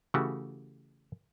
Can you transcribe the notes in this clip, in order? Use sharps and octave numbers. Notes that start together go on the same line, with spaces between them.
C#3 E3 A3 F#4 G4